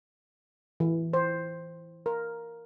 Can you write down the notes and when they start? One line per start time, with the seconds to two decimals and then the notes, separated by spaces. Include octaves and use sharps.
0.80 E3
1.13 C5
2.06 A#4